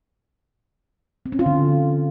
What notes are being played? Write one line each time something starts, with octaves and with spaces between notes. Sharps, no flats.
C4
C#4
F4
D3